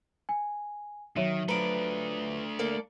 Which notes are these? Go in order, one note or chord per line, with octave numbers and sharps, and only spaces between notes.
G#5
D#3 F#3 C#5 E5 D#7
F3 A3 D4 B4 A#5 D7
A#3 A4 D5